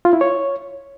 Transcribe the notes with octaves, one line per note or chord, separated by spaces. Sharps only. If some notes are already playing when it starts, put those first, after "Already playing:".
F4
E4
C#5